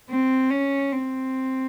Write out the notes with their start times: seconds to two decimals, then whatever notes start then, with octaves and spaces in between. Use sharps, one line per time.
0.10 C4
0.50 C#4
0.92 C4